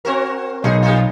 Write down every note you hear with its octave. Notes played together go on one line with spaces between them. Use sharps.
C4 F#4 A#4
B1 D#4 G#4 A#4
G3 D#4 F4